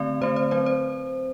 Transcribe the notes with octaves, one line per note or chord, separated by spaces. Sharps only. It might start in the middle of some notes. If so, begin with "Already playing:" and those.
Already playing: D3 A3 C4 D5
D3 A3 C4 C5
C5
F#3 C4 C5
C5